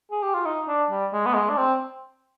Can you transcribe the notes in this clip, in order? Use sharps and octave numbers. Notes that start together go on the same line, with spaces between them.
G#4
G4
F4
D#4
D4
G3
G#3
B3
G#3
D4
C4